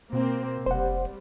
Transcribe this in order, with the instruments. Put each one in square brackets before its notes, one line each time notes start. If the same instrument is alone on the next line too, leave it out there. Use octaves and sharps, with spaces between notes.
[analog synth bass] B2 [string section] A#3 C4
[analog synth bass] F1 [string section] G3 [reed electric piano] C5 F#5